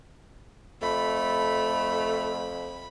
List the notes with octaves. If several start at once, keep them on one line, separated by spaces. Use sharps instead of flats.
F2 A3 B5